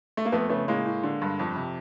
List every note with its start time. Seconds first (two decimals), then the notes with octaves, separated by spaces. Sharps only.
0.17 A3
0.25 A#3
0.32 F2 A3 B3
0.49 C#3 A3 B3
0.68 A2 G#3 A#3
0.85 A2
1.03 D3
1.21 G2
1.39 F2
1.56 C3